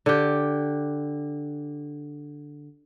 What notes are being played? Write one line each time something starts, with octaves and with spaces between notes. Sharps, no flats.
D3 G4